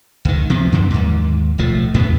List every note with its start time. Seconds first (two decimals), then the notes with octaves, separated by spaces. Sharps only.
0.25 C#2 D#3
0.50 C3 F3 B3 C4
0.72 F#2 D3 F#3
0.90 D#2 G#2
1.58 D1 B1 F3 A3
1.94 E2 A2 D3 B3